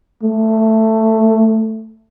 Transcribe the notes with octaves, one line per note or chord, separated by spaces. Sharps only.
A3